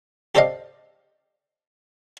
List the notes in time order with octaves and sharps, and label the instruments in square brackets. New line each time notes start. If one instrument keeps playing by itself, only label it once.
[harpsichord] G4 A4 C5 D5 D#5 F5